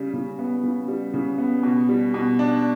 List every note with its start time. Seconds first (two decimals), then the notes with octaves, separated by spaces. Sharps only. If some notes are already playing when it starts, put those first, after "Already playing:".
Already playing: C#3 G3
0.13 C#3
0.39 B3
0.63 C#3
0.88 G3
1.14 C#3
1.38 B3
1.63 B2
1.89 G3
2.14 B2
2.39 D4